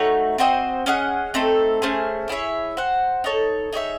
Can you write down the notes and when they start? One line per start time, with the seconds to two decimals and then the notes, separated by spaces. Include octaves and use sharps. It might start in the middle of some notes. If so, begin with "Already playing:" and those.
Already playing: A3 D#4 F#4 C#5
0.38 C4 F#4 C5 D#5
0.86 C#4 G#4 D#5 F#5
1.34 A3 C4 D#4 A4
1.82 A3 C#4 G#4 C5
2.29 E4 G#4 C#5 E5
2.77 F#4 C5 F#5
3.24 D#4 A4 C#5
3.73 D#4 G#4 C#5 E5